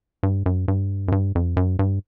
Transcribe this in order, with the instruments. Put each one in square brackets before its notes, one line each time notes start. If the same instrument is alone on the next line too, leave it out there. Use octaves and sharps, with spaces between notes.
[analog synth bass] G2
F#2
G2
F#2
G2
F2
F#2
G2